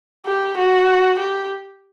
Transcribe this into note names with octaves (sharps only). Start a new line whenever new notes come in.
G4
F#4
G4